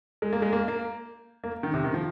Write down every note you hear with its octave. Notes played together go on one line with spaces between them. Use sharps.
G#3
A#3
G#3
A#3
A#3
A#3
D#3
C3
D#3
F3